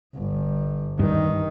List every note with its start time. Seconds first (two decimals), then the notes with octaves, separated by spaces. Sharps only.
0.15 G1
0.99 G2 D#3